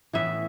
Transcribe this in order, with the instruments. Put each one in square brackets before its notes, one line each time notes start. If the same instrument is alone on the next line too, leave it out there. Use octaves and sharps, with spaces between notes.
[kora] A2 E3 B3 E5